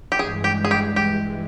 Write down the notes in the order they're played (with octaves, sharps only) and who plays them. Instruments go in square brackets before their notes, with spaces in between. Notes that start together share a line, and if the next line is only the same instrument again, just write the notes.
[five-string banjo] G4
[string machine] G2 E3 G#3 [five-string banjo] G#4
[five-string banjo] G4
G#4
G4
G4